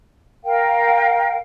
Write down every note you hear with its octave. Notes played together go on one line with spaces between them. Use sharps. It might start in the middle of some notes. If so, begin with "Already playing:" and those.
A#4 F5 G5